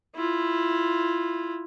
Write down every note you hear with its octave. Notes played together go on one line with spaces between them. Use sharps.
E4 F4